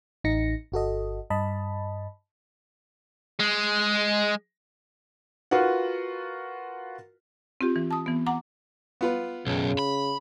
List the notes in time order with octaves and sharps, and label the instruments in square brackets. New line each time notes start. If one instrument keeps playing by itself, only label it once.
[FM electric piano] A1 D#4 A#6 C#7
G1 F#4 A4 D#5
G2 D#5 A5 B5
[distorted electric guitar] G#3
[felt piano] F4 F#4 A#4 B4 F#5
[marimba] C4 F4 G4
E3
A5 D#6
E3 B3
F#5 A#5 D6
[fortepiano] B3 F4 B4
[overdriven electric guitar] B1 F#2 [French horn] C#3
[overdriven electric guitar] B5